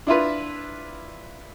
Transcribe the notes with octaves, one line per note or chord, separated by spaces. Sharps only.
D4 E4 F4 B4